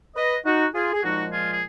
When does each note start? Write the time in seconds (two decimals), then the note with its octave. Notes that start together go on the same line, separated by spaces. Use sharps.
0.16 B4 D#5
0.45 D#4 F#4
0.74 F4 G#4
0.93 G#4
1.03 A#2 F3 G#3 D#4 F#4
1.33 F4 G#4
1.51 G#4